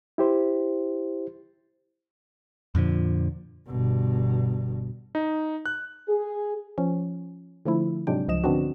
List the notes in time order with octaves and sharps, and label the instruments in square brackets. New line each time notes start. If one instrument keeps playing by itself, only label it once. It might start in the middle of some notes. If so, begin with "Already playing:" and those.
[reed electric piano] E4 G4 C5
[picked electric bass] F2 A#2 D3 F3
[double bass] G1 B2
[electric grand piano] D#4
F#6
[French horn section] G#4
[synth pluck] F3 C#4
D3 F3 A3 E4
G#2 C3 F#3 G#3 D4 G5
C#2 F3 D#5 E7
G#2 D3 B3 C4 D4 F#4